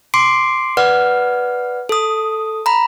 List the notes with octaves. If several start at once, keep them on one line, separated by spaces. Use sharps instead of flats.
C6 D6 C7 D7
B4 D5 F#5 F6
A4 D#6
A#5 B5